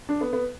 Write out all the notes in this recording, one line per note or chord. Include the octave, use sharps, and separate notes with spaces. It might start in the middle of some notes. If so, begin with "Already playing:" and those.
D4
B3
B3